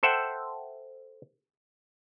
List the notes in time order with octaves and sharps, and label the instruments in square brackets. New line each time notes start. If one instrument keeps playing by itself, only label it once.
[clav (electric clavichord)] A4 C5 E5 F#5 G5